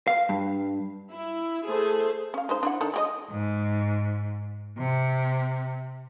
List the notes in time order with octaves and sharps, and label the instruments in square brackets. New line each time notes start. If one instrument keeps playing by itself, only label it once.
[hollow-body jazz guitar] F5
G2
[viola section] E4
A3 G#4 A4 C5
[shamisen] C#4 F5
G#3 D#4 C5
D4 E4 F#5
D#3 D4 A4
G#3 G4 D#5
[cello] G#2
C3